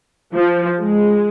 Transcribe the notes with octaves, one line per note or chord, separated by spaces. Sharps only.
F3
G#3